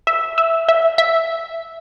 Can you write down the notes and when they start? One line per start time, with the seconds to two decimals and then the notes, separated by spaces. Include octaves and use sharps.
0.07 E5
0.38 E5
0.69 E5
0.98 E5